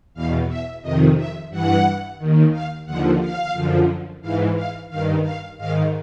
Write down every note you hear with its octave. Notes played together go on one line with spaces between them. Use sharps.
E2 B2 F5
E5
F2 C3 D#3 D#5
E5
G2 E3 F#5
D#2 D#3
F5
D#2 D3 F3 F#5
F5
F#2 D3 F3
G#2 E3 F5
F5
G2 D#3 F5
F5
G#2 D#3 F5